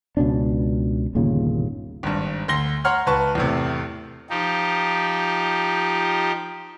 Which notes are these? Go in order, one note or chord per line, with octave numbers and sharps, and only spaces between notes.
C#2 B2 C#4 D4
G1 D#2 A#2 C#3
G#1 G2
D2 C6 A#6 G7
C#5 F#5 A#5 C6 F6
C#2 B4 A5 C#6
E2 A2 C3
F3 D#4 G4